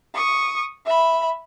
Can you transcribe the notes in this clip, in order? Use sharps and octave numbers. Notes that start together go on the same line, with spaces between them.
C#6 D#6
E5 B5